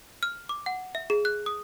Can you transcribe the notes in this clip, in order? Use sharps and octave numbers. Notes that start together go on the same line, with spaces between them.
F6
D6
F#5
E5
G#4
F#6
D#6